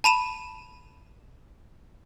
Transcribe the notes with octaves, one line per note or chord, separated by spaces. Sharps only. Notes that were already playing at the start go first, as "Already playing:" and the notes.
A5 B5 D#7 E7